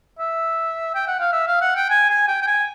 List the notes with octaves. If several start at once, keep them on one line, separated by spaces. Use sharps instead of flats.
E5
G5
F#5
F5
E5
F5
F#5
G5
G#5
G#5
G5
G5
G#5